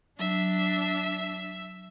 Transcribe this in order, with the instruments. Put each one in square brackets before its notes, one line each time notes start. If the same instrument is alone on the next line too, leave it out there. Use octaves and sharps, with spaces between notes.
[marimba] F#3 [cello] D4 [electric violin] E5